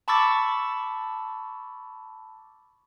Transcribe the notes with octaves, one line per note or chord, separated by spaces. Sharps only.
A5 B5 C#6 D6 E6 A6